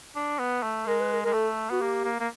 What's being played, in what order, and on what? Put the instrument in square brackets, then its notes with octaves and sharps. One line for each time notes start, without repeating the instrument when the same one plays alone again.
[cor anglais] D4
B3
A3
[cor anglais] G#3 [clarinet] A#4
[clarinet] B4
A#4
[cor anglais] G#3 [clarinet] A#4
[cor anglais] A3 [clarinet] A4
[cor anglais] B3 [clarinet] F#4
[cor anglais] A#3 [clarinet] G4
[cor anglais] A#3
A#3